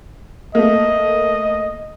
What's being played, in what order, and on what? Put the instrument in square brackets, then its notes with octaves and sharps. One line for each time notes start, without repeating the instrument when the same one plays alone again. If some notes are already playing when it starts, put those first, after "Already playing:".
[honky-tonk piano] A3 A#3 [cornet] D#5